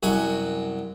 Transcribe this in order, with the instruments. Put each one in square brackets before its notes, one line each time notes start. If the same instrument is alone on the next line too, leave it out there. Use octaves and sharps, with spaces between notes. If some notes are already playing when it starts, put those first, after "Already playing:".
[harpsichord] C2 F#2 F#4 G#5